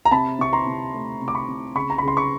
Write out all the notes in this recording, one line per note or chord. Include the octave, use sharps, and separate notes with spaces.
A#5
C3 A5 B5
C3 C#6
A#5 C6
C3
A3
C3
D6
B5 C#6
C3
C#3 B5 C#6
A#5
B5
C#3
C6
B5 C#6